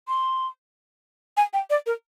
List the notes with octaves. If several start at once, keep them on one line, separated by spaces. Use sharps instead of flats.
C6
G#5
G5
D5
A#4